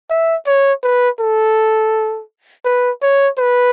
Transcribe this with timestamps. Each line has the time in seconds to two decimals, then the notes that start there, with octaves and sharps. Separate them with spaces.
0.10 E5
0.47 C#5
0.83 B4
1.20 A4
2.65 B4
3.02 C#5
3.39 B4